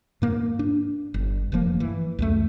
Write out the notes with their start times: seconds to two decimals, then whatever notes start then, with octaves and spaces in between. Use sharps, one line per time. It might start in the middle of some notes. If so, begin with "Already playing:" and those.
0.22 G#2 A#3
0.59 D4
1.14 G1
1.52 F1 G2 F3 A#3
1.80 E3
2.19 C#2 F#2 A3